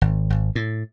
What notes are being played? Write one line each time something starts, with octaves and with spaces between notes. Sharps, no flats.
G#1
G#1
A2